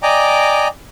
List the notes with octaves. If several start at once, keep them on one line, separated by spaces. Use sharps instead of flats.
D5 D#5 G5 G#5 A#5 D6